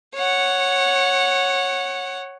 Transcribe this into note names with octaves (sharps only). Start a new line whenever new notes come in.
C#5 F#5